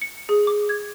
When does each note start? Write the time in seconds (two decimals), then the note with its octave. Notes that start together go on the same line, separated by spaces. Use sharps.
0.02 C#7
0.29 G#4
0.47 D6
0.69 G#6